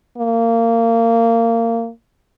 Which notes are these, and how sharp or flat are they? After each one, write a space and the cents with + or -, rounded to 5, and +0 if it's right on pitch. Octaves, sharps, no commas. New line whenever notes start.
A#3 -25